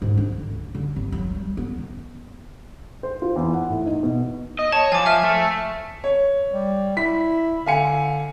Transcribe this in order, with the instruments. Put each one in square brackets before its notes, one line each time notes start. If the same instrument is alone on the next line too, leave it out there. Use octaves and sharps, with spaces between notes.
[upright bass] G#2
D4
D3
D2
D3
G1
F#3
G3
B3
D#3
[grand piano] C5
F4
E2
F#5
A2
D#4
B2
[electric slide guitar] D#5
[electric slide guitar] C#5 [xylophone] A5
[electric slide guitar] F3 [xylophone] G#5 D6
[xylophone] E5 G#5 F6
[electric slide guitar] A3
[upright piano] C#5
[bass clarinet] G3
[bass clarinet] E4 [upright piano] B6
[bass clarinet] D3 [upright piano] F5 G#5 C#7